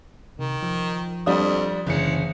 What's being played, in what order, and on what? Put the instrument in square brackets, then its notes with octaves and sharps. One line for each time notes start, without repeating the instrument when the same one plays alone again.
[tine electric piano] C3 [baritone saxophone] D#3
[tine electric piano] F3
[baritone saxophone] F2 [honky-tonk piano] G3 D4 D#6
[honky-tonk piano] F#1 C#7 [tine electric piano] D3 E3 C#4 [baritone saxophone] G#3